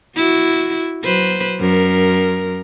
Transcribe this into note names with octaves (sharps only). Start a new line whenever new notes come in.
E4 F#4
F#3 B4 C5
F#2 A#4